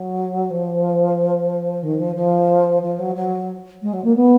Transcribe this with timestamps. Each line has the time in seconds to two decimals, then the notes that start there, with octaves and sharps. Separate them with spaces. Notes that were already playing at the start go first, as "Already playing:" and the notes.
Already playing: F#3
0.50 F3
1.83 D#3
1.99 F3
2.16 F3
2.82 F3
2.99 F#3
3.15 F#3
3.82 G#3
3.93 F#3
4.04 A#3
4.16 B3